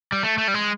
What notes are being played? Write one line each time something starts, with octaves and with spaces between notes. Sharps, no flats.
G3
A3
A3
G3
G#3